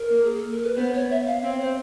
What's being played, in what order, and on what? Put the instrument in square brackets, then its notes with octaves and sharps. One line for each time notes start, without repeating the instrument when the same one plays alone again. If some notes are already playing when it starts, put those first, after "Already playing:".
Already playing: [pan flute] A#4
[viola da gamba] A#3
[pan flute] G#4
A4
A#4
B4
[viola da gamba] B3 [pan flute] C5
[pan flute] C#5
E5
F5
[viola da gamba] C4 [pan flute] C#5
[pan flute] C5